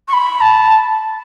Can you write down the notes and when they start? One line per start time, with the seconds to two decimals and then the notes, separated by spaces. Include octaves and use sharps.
0.08 C#6
0.13 B5
0.41 A5